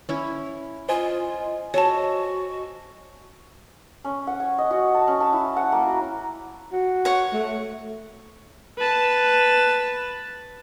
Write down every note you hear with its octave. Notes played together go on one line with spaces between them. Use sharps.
C#4 E4
F4 C5 D#5 G#5
F#4 A4 C#5 A5
C#4
F#5
G#5
D#5
F#4
A5
C#4
A5
E4
F#5
A#3
F#4
F#4
C#5 F#5
A3
B4 A5